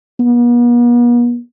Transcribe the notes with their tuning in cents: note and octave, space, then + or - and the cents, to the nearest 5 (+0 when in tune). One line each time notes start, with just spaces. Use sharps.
B3 -45